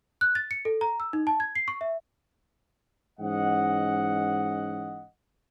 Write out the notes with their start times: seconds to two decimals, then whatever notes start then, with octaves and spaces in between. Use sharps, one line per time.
0.21 F#6
0.35 A6
0.51 C#7
0.65 A4
0.81 A#5
1.00 E6
1.13 D#4
1.27 A5
1.40 G#6
1.55 C7
1.68 C#6
1.81 E5
3.19 G#2 E3 C#4 D#5 F#5